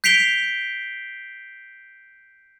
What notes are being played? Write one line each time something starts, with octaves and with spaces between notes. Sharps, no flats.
G6 B6 C7 D7 F7 G7